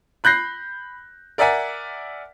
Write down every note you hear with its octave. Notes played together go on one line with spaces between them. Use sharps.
B5 F#6 G6 A#6 C7
A#4 D5 E5 F#5 G#5 B6